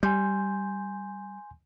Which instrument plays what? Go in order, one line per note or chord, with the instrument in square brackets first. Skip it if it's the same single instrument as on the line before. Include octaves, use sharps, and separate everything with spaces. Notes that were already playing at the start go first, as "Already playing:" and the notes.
[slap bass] G3 [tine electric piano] G#5 C6 G6